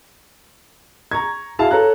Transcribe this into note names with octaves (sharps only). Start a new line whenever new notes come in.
A#5 C#6 G#6
E4 F#4 G#4 F5 A5
A4 C#5 A#5 F#6